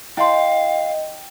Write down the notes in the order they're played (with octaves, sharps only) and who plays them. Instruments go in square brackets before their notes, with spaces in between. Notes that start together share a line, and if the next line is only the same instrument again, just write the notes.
[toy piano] E4 C6 [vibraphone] D#5 [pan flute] F5 [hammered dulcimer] G5